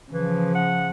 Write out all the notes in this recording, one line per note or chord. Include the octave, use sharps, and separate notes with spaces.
C#3 E3 F3
F#5